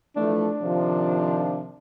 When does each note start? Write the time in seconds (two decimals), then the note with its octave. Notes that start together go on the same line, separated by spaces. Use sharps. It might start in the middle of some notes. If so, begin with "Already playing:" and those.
0.16 E3 F3 A3 D4
0.62 C3 D#3 F3